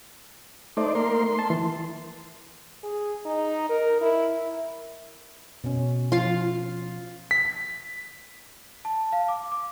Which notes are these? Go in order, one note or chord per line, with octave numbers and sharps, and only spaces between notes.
A3 D#4 C5 D5
A#3 A#4 C6
C6
A5
E3
G#4
D#4
A#4
E4
B2 C#4
F3 F4 F5
B6
A5
F5
D6
D6